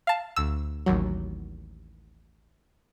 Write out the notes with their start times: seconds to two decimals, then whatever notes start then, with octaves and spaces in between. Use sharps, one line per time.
0.07 F5 A5
0.36 D2 E6
0.86 A1 D#2 F#3